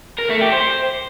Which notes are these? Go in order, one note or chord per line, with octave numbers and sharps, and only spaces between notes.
A#4
A3
G4
C5